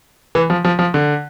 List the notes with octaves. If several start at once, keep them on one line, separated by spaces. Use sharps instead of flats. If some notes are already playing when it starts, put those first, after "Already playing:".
E3
F3
F3
F3
D3